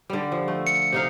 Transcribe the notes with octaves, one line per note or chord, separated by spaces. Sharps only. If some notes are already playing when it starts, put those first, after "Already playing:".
D3 G3
F3
A3
C#7
C3 D#4 F5